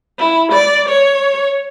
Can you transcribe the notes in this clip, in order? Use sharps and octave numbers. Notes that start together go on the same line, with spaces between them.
E4
D5
C#5